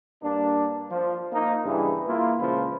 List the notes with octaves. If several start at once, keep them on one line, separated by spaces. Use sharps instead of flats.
G2 A#3 D4
F3
A#3 D#4
G2 C#3 E3
A#3 E4 F4
C#2 A#2 F3 B4